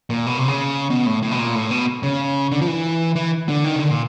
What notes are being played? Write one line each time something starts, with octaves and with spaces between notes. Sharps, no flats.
A#2
B2
C3
C#3
B2
A2
A2
B2
A#2
A2
B2
C#3
D3
F3
E3
E3
D3
D#3
C#3
D3
A#2